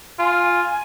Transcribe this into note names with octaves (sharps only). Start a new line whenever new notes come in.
F4 G#5